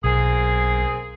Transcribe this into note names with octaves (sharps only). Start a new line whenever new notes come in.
B1 A#3 C4 G#4